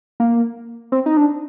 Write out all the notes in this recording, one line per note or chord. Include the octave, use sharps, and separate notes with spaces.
A#3
C4
D#4
D4